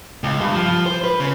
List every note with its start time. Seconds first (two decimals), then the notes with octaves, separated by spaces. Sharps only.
0.24 C#2
0.41 G2
0.53 F3
0.86 C5
1.04 B4
1.20 C#3